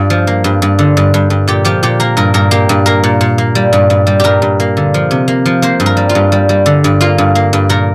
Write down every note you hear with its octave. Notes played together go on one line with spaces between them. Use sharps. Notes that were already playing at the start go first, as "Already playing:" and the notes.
Already playing: G2 F4
F3
A#3
G2
G2
D3
G2
G2
G2
A#2 G4
F3 G4
A#2 G4
A#3 A#4
G2 A#4
G2 A#4
A#3 G4
G2
A#3 A#4
A#2
A#2
A#3
G3
G2
G2
G3
G2 G4 A#4
G2
A#3
D3
F3
C3
A#3
F3
A#3 C5
G2
A#4
G3
F4
G2
G3
G3
D3
G2
A#3 F4
G2
A#3
G2
A#2 A#4